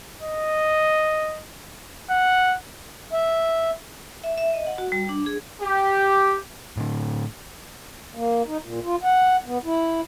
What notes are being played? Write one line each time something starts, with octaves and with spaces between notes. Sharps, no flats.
D#5
F#5
E5
E5
E5
D#5
F#5
F#4
G3
D4
G#4
G4
A2 D3
A#3
D#4
A#2
F4
F#5
B3
E4